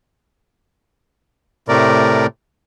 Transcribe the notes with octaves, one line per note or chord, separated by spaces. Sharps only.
A2 C3 A3 A#4 D5